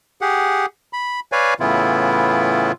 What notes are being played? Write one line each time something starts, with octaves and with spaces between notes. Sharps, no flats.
G4 G#4 F#5
B5
B4 C#5 D5 F5 G#5
A2 C#3 E3 B3 E4 F4